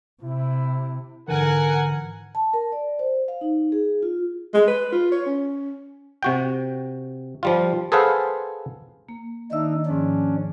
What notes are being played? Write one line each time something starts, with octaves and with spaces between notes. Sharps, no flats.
C3 E4
G#2 D3 E3 A#4 F#5 G#5
A5
A#4
D5
C5
F5
D#4
G#4
F4
G#3
B4
F4
C#5
C#4
C3 F#4 G5
F3 G3 F4
G#4 A4 B4 C5 F5 F#5
A#3
D#3 D4 D#4 E5 E6
G#2 F3 C#4 D4